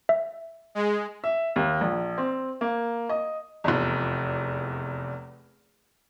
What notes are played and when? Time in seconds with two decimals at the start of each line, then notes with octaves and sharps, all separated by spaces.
0.09 E5
0.75 G#3
1.24 E5
1.56 D#2
1.81 A#1
2.18 C4
2.61 A#3
3.09 D#5
3.64 F1 E2